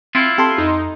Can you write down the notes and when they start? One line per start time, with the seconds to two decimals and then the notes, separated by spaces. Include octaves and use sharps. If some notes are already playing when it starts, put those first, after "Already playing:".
0.15 C4 E4 F4
0.38 C4 G4 A4 C6
0.58 F2 D#4